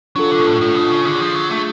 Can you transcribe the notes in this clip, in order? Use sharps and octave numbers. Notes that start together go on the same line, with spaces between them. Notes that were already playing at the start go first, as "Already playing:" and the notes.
F#3 D4 F4 A4
D3
B2
A2
A2 D4 F4 A4
B2
C#3
D3 D4 F4 G#4
F3
F#3
A3 D4 F4 G#4